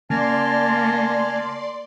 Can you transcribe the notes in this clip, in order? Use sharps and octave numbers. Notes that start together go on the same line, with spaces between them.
C#3 A#3 D5 G#5 A5 C6 F6